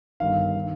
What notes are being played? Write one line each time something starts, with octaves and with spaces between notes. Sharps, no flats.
G1 G2 D#3 F5
D#3